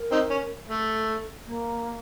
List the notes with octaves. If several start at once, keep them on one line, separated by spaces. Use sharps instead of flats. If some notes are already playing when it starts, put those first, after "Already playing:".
Already playing: A#4
C4 D#4
C#4
A3 A4
A#3